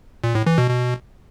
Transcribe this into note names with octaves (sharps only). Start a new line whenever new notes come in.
A#2
A2
E3
B2
B2